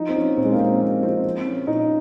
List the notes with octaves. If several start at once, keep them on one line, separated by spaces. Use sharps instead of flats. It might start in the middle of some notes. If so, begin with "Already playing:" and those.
Already playing: F3 D#4
C4
F3 C#4
A#2 C4
G#3
A#3
A#2 C4
F3 A#3
F3 C4
F3
F3 C#4
A#2 D#4